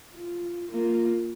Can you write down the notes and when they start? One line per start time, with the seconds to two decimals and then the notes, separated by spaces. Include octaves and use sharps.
0.14 F4
0.70 A#3 F4